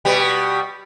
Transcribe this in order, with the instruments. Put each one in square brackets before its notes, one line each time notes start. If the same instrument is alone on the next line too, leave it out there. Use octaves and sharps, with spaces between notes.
[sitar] B2 G3